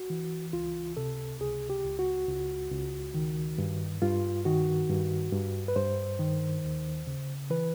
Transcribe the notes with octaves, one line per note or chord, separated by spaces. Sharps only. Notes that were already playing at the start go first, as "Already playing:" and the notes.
Already playing: F#4
E3
C#2 F4
C3 A4
C#2 G#4
G4
C#2
F#4
C#2
C#2
D#3
G2
G2 F4
D#3 F#4
G2
G2
B4
G2 C5
D#3
D#2
C#3
E3 B4